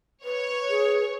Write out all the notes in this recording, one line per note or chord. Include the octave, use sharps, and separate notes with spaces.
B4 C#5
G#4